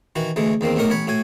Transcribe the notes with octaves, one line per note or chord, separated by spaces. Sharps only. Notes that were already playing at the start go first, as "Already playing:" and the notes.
D#3 E3 F#4
D2 E3 G#3 A3
E2 D#3 A#3 C4
B1 A2 A3 A#4 D#5 D6
A1 C#5 B5
A2 F#4 G#5